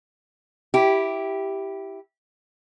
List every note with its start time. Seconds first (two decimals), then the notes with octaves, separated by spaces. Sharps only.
0.74 E4 G4